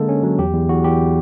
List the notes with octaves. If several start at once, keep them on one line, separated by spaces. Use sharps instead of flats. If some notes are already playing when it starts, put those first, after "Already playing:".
Already playing: D3 G#3 A#3 A4
C#4
F#3
E2 G4
E2
E2 F#4
E2 G4